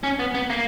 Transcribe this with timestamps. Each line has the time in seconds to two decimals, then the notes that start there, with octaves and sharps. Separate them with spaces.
0.03 C#4
0.19 B3
0.34 B3
0.50 A#3